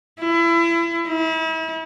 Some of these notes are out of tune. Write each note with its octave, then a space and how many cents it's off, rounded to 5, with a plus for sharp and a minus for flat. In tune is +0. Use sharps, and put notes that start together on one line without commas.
E4 +30
E4 -40